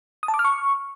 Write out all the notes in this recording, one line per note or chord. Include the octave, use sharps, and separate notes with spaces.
D#6
A5
D6
F6
C#6